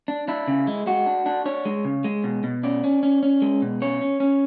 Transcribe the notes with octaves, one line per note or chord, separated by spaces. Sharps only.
D4
D4 E4
C#3
G#3
G#3 F#4
D4
D4
D4 C#5
G#3
C#3
G#3
B2
B2
C#4 D5
C#4
C#4
C#4
G#3
B2
C#4 C#5
C#4
C#4